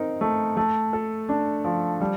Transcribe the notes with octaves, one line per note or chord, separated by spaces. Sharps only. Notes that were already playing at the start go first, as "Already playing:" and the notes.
Already playing: C4 D#4 A#4
A3
A3
A4
D4
F3
G3